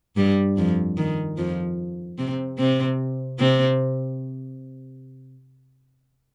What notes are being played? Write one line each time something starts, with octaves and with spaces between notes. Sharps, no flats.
G2 G3
F2 F3
D#3
F2 F3
C3 C4
C3 C4
C3 C4